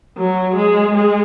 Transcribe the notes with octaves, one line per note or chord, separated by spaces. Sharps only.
F#3
G#3
G#3